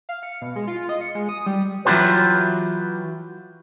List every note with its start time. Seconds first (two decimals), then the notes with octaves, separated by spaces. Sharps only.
0.09 F5
0.23 C#7
0.42 B2
0.56 G#3
0.67 F4
0.89 D#5
1.01 C#7
1.15 G#3
1.29 D#6
1.46 G3
1.85 E3 F#3 D#4 F4 G4 B4